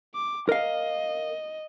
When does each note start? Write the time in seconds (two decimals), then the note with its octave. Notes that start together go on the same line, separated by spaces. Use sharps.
0.14 D6
0.49 A#4 D#5 F5